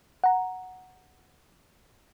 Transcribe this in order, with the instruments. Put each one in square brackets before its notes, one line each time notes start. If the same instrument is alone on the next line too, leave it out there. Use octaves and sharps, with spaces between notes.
[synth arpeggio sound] F#5 A#5